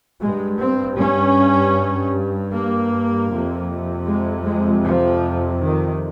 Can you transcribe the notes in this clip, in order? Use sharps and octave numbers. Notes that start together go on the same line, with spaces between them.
G2 G#3
C4
C#4
A#3
F2 C3
G#3
G#3
F3
D#3